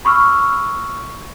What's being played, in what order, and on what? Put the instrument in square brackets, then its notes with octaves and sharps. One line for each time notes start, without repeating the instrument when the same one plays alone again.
[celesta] B5 C#6 D6 E6 F6